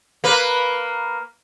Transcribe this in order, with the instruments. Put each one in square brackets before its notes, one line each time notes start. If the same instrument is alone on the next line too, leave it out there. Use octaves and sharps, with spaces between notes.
[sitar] A#3 B4